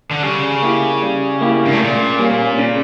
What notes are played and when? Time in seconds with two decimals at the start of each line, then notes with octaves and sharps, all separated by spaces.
0.11 D3
0.23 C#3 G3
0.62 A#3 E4 G4
1.02 G3
1.41 A#3 E4 G4
1.65 G2
1.72 A2
1.79 A#2 C#3
2.19 G3 A#3 C#4
2.58 C#3